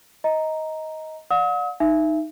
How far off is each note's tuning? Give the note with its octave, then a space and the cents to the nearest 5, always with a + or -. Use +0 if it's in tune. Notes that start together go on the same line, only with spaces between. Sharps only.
D#5 +15 A#5 +0
D5 +0 F#5 -45 D#6 +45
D#4 +0 E5 +25